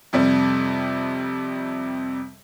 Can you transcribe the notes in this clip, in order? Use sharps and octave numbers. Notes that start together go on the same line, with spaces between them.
F2 C3 G3